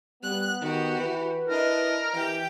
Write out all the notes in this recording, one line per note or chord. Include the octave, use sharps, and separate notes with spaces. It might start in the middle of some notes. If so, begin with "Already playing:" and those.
G3 B3 F#6
D#3 F#4 G4
E3 B4
D4 E4 A#4 D#5
E3 G4 G5